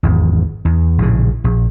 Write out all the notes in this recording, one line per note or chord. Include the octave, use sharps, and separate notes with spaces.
G#1 E2
E2
A#1 A2 C#3
A#1